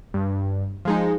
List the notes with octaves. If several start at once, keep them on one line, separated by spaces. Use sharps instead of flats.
G2
F3 G#3 D#4